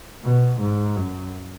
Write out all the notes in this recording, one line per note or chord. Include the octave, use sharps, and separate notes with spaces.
B2
G#2
F#2